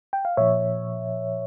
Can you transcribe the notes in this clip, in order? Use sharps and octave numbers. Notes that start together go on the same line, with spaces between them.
G5
F5
A#2 F3 C#5 E5